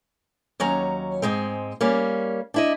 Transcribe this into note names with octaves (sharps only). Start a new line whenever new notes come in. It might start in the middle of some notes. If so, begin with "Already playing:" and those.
D#2 F#3 C#4 A#5
G#2 G#3 C4
G3 A#3 C#4
D4 E4 D#5